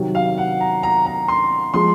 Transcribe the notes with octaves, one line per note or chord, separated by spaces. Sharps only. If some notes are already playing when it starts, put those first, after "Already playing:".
Already playing: C3 D#3 F#3
F5
F#5
A#5
A#5
A#5
C6
F3 G#3 C6